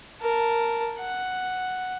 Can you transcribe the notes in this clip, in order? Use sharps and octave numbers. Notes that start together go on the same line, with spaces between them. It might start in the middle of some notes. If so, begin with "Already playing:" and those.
A#4 A5
F#5